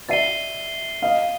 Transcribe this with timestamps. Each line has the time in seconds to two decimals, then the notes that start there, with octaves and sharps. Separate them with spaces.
0.09 D5 E5 A6 C7 D#7 G7
1.02 D#5 F5